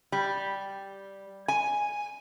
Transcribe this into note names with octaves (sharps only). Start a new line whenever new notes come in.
G3
G#5